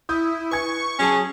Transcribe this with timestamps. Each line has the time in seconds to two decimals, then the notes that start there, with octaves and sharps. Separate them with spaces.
0.09 E4 D#6 G6
0.51 B4 G#5 C#6 G#6
1.00 F#3 C#4 G#4 A5